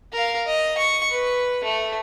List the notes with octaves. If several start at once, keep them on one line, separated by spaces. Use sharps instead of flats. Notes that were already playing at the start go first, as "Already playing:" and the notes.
A#4 F5
D#5
C#6
B4
A3